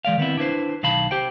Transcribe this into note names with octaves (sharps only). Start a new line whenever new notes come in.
E3 G#3 D5 F5
D#3 B3 C4 E4
D4 E4 B4 C5
B1 D#3 F5 A5 B5
G4 C5 G5